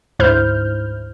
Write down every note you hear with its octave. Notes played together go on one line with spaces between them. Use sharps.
D2 G#2 E4 C5 F6 G6